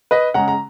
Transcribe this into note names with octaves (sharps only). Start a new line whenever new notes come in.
B4 D#5
C#3 G#3 C#4 F#5 A#5
A#5